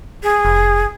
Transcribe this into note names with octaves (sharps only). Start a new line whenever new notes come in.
G#4
F1